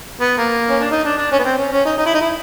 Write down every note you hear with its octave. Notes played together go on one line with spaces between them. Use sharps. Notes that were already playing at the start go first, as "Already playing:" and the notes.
B3
A#3
C#4
D4
D#4
D4
D4
C#4
B3
C4
C#4
C#4
D#4
D#4
E4
D#4
E4